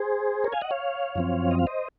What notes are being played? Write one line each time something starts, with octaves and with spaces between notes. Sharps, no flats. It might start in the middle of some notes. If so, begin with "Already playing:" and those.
Already playing: G#4 C5
A#4 C#5
F5 G#5
D#5 F#5
C#5 F5
F#2 F3 C4
D#5
F5
C5 D#5